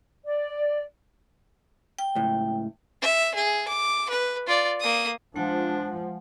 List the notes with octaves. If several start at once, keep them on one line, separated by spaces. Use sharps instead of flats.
D5
G5
C#2 A2
E5
G#4
D6
B4
F4 D5
A#3 D#6
F3 G#3 D4 F#5